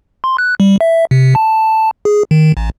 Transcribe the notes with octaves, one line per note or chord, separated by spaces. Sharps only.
C6
F#6
G3
E5
C3
A5
G#4
D#3
A1